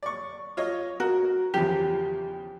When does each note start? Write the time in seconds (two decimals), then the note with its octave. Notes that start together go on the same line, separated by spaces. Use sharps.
0.03 D5 C#6
0.57 F4 C#5 D#5
1.00 F#4 A#4
1.54 E2 C#3 F3 G4